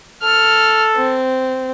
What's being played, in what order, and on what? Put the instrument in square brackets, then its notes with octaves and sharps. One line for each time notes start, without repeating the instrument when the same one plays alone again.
[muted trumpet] A4 [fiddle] F6
[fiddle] C4